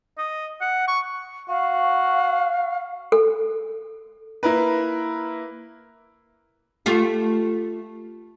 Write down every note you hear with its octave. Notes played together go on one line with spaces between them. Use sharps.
D#5
F#5
C#6
F#4 F5
A4
A#3 E4 A#4 B4
A3 F4 G4